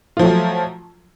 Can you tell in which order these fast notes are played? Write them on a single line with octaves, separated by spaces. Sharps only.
F4 F3 A3 F#3